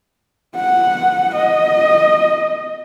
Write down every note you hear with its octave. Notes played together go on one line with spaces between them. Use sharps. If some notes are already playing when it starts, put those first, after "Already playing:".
F#5
D#5